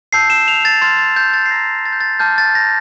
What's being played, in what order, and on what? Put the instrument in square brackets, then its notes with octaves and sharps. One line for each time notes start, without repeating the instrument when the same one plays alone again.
[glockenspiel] A5 E6 G6 C7
E7
F7
A6
C6 F6 A6
A6
G6
G6
A6
C7
A#5 E6 G6 A#6
A6
G6
A6
A5 D6 F6 G6
A6
A#6